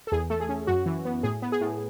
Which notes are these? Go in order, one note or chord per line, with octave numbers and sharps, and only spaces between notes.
A4
E2 G#4
A3 A4
G#4
C#4
F#2 F#4
E3
B3
A2 G#4
B3
G#4
A2